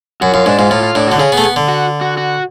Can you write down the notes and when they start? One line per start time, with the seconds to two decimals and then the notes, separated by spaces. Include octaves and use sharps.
0.21 F#2 F#4
0.34 F#2 F4
0.46 G#2 D4
0.58 G#2 F4
0.70 A2 F4
0.83 F4
0.95 A2 D4
1.07 D3 F#4
1.19 C#3 G#4
1.32 B3
1.37 A3
1.44 B3
1.56 D3
1.68 F#4
2.01 F#4
2.17 F#4